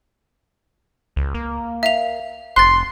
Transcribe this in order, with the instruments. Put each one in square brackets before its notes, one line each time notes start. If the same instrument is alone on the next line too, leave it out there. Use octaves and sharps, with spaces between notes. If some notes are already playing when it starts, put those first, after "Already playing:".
[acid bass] C#2
A#3
[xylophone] E5 F5 F7
[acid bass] F1 [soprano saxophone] C6 [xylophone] F#6 A6